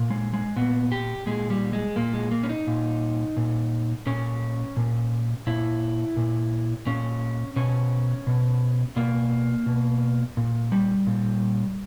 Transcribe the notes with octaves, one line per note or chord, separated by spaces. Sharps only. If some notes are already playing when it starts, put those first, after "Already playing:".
Already playing: A#2
G#3
G#3
A#2 B3
G4
A#2 G#3
G3
G#3
A#2 A#3
G#3
A#3
C#4
D#4
A#2
A#2
A#2 C#4
A#2
A#2 E4
A#2
A#2 C#4
B2 C#4
B2
B2 A#3
B2
A#2
G3
A#2